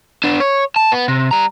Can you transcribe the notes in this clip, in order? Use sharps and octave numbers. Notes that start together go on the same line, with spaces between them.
B3 D4
C#5
A5
B3
C3
G3 A#5